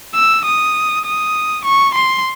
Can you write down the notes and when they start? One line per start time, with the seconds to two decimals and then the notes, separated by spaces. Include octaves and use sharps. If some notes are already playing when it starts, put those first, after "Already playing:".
0.15 E6
0.45 D#6
1.05 D#6
1.65 C#6
1.94 C6